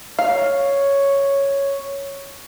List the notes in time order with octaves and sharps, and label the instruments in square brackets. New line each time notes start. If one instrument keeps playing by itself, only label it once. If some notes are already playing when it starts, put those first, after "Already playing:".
[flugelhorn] C#5 [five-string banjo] F5